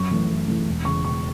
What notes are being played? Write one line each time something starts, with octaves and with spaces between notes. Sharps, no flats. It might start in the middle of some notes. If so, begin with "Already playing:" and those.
Already playing: F#2 C#6
E3 A3
F#2
E3 A3
E1
E2 C#3 C#6
E1 C#6